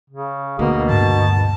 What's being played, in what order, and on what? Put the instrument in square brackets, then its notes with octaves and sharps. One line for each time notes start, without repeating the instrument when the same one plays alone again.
[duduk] C#3
[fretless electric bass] D2 [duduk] B2 [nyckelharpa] A#3 B3
[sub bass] G2 [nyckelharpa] A5